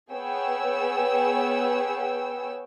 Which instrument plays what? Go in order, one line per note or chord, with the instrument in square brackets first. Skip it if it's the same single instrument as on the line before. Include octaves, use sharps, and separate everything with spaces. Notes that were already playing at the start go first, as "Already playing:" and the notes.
[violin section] B3 G#4 C#5 G5 E6